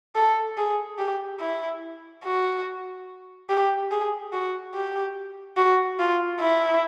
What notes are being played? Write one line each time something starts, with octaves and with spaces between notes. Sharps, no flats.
A4
G#4
G4
E4
F#4
G4
G#4
F#4
G4
F#4
F4
E4